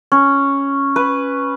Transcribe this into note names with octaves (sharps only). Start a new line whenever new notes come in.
C#4
B4